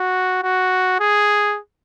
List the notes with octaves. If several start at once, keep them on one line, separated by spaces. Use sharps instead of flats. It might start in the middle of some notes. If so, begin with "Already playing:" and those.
Already playing: F#4
F#4
G#4